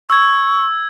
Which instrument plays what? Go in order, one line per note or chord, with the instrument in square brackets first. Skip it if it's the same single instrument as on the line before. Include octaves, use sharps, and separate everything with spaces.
[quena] C#6 [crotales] E6 G#6